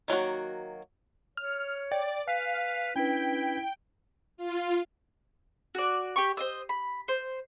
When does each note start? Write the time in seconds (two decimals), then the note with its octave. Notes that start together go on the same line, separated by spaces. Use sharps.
0.08 D#3 F#3 A#3 F#4
1.37 C#5 F6
1.91 D5 G5
2.27 B4 F5 G#5
2.96 C#4 D4 E4 B4 G5
4.37 F4
5.75 F#4 D5
6.16 G4 G5 C#6
6.37 C5 D#5 E6
6.69 B5
7.08 C5